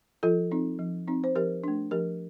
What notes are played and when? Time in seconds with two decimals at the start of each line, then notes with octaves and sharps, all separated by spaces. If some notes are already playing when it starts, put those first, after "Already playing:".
0.23 F3 F4 A4
0.51 C4 D#4
0.79 F3
1.08 C4 D#4
1.24 C5
1.35 F3 G4 A#4
1.64 A3 D4
1.91 F3 G4 A#4